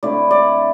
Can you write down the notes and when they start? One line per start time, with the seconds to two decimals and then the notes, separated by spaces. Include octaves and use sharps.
0.03 D3 A3 C4 E4 D5
0.31 D5